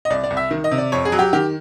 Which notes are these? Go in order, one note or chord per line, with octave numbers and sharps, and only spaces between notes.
D#5
C2 D5
D5
C2
E5
D#3
D#5
C3
D5
F2 C#5
G#4
F#3
G4
D#3 G4